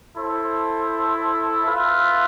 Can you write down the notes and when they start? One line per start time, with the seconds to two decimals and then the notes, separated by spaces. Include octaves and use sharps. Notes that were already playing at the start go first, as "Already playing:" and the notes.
0.15 E4 A4 C5
1.65 F4 B4 E5